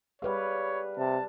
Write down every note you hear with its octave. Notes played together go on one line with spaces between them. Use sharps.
G3 G#4 B4 C#5 F5
C3 A5